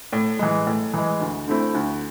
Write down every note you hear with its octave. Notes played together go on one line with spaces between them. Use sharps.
A2
E3 G#3
A2
E3 G#3
D2
D3 A3 C4 E4
D2